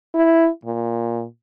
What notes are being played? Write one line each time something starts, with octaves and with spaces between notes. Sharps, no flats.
E4
A#2